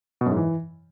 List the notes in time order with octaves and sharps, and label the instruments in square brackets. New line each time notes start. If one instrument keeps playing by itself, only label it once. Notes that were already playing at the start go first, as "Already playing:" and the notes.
[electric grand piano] B2
F#2
G#2
E3